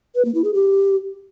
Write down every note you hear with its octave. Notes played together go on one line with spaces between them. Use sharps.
B4
A#3
E4
G#4
G4